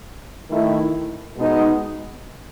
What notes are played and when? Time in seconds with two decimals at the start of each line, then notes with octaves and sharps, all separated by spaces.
0.50 D#3 A3 E4
1.36 B2 G#3 B3 D#4